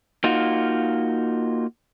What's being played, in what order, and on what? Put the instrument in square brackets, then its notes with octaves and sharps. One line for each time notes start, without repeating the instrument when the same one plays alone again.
[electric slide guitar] A#3 D#4 F4 F#4